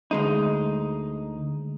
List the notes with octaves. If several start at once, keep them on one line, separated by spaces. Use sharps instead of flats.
D2 G#3 D#4